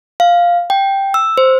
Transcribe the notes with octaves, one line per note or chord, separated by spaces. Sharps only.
F5
G5
E6
C5